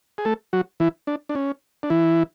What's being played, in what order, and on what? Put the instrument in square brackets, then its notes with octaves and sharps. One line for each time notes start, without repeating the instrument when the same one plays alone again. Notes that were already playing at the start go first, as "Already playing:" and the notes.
[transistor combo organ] G#4
A3 A4
F#3 F#4
E3 E4
D4
D4
C#4
D4
E3 E4